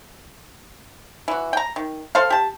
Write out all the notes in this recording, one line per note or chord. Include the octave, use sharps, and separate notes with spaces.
E3 F#4
G5 A#5
D#3
A4 C5 F5
G4 A5